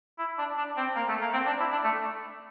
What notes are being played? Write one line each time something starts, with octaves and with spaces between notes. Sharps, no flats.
E4
D4
D4
C4
A#3
A3
A#3
C4
D4
E4
D4
A3